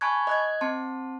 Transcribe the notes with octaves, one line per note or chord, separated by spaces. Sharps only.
G#5 A5 B5 C#6 F#6 G#6
D#5 F#6 G#6
C4 A5 C6